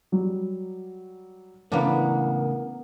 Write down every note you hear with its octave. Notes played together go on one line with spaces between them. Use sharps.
F#3 G3
C#2 A2 C#3 E3 A#3 B3 D4 A#4